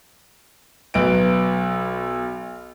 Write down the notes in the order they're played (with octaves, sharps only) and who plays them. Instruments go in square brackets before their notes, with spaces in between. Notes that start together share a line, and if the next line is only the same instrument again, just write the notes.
[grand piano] B1 B4 D7